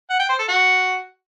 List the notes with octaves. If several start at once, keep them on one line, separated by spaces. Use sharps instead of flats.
F#5
G5
C5
A4
F#4